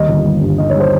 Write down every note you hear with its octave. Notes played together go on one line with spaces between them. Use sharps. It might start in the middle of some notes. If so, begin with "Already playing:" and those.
Already playing: D#2 G3 D#5
G1
G3
G2
D#3 D#5
C#5
G3 C5